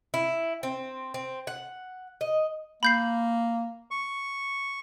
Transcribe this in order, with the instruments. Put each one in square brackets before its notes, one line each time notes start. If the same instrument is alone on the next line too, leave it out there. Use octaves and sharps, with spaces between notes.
[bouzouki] E4
C4
C4
F#5
D#5
[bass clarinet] A#3 [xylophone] B5 G6 C7
[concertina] C#6